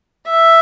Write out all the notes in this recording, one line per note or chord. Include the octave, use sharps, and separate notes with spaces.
E5